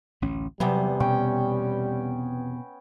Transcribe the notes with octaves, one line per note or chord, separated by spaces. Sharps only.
A1 D2 C#4
E2 C3 F#3 G3 B3
B2 C#4 C#5 G5